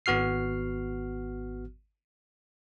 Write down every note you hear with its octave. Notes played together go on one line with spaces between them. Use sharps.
G#1 B3 F#4 F6 C7